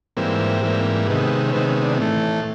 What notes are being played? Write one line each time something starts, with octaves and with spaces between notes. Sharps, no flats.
G#2 E3 G3 A#3 C4
G#2 E3 G3 A#3
C3 D#3 G#3 B3
C#4
C3 D#3 G#3 B3 C4
C#4
D4
A2 E3 A3